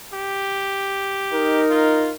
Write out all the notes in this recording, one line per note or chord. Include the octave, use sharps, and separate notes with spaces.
G4
D#4 A#4
F4